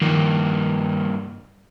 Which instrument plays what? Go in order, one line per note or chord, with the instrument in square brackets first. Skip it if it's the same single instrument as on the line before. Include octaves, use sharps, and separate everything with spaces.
[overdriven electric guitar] G2 A#3 [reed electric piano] D#3 F3